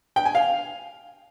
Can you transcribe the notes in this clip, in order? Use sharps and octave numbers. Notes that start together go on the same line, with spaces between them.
G5
G#5
F5